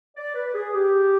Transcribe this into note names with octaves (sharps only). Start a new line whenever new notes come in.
D5
B4
G#4
G4